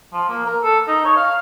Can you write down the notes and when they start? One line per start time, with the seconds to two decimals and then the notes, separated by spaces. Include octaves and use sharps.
0.13 F3
0.29 A#3
0.46 A#4
0.63 A4
0.88 D#4
1.05 C#5
1.17 F5